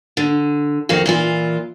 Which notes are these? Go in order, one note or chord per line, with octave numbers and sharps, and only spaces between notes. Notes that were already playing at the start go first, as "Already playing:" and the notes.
D3
F2 D#3 F#4 F5
A#2 E3 F4